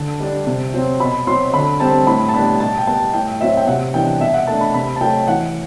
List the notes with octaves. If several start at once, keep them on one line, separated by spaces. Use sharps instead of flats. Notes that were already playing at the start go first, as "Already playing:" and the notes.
Already playing: D3 A5
G3 D4
C3
F#3 C4
B2 B5
F#3 C4 C6
D3 B5
G3 C4 A5
A2 B5
A5
G3 B3 D4 B5
B2 A5
G5
G3 B3 A5
A2 G5
F#3 C4 E5
G5
C3 F#5
E3 G3 B3 D4 G5
B2 E5
F#5
A3 D4 A5
B5
C3 B5
A5
F#3 A3 G5
E3 F#5